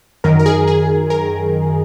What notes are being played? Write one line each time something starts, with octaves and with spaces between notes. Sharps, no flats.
F#2 D#3 A#4
A#4
G#4
G#4
A#4